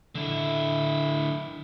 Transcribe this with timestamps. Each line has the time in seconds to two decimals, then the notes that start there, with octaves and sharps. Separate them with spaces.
0.15 D3 E4